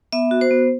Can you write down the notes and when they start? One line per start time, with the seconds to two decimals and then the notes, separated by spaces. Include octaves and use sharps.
0.13 B3 E5
0.31 F#4
0.41 C5
0.51 B3